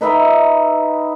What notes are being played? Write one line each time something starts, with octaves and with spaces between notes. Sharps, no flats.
D#4 B4 E5 G5